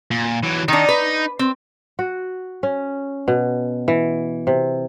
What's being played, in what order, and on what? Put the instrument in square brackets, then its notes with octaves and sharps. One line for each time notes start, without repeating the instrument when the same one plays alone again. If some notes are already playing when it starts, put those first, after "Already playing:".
[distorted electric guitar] A#2
E3 F#3
[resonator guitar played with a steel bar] D#3 D4 [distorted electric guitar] D#4
[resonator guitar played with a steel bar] B4
C4
[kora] F#4
C#4
B2
E3
C3